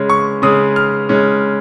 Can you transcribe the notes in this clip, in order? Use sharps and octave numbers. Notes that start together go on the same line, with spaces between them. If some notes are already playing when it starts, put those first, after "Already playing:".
Already playing: C#3 G#3 C#4
C#6
C#3 G#3 C#4 D#6
F6
C#3 G#3 C#4